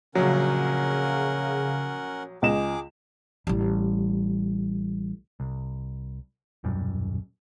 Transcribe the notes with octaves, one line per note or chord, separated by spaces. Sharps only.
A#1 C#3 F#3 C#4 A#4 F#5
C#2 G#4 D#5 D6 E7
A1 G3
C2
D#1 B1 F#2 G3